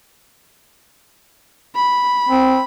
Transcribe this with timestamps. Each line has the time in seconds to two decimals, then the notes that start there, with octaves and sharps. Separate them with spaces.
1.76 B5
2.29 C4